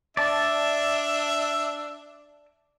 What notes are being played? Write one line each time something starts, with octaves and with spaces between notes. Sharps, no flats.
D4 D5 E5 A5